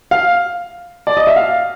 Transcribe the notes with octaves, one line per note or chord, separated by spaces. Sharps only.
F5
D5
D#5
E5
F5